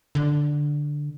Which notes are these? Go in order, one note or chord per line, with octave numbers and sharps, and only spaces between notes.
D3